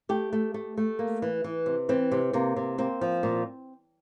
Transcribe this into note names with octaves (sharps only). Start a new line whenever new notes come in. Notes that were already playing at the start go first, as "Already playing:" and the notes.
A3 G4
A3
A3
A3
A#3
E3
E3
C3
E3 C4
C3
C3 A#3
C3
A#3 C4
F3
A#2